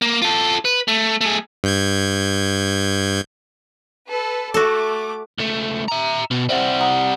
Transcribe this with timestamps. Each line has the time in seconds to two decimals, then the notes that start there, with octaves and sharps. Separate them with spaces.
0.02 A#3
0.22 F4 A4
0.65 B4
0.88 A3
1.21 A3 G#4
1.64 G2 G6 G#6
4.10 A4 B4
4.54 A3 F#4 A4 D6
5.38 C#2 A3
5.88 E5 A#5
6.31 B2
6.49 C3 G3 C5 E5 F#5
6.81 F#5 A#5 D#6